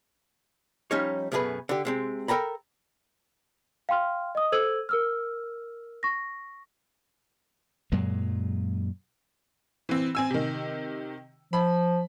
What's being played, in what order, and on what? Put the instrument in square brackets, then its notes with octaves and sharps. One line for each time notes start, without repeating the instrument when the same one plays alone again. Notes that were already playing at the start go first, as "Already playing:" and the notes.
[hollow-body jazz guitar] F3 G3 C#4 D#4 C#5
F#2 B2 A3 C#4 G#4 B4
D3 G4
C3 G#3 C4
A4 A#4 G5 A#5 B5
[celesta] F5 G5 C6 F6
D#5 D#6
A4 C5 E6 G#6 D#7 F#7
A#4 E6 F6
C#6 A#6
[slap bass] F#2 A#2 F#3 G#3
[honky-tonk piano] E3 C4
C4 G#5 E6
C3 D#3
[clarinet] F3 [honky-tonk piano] B5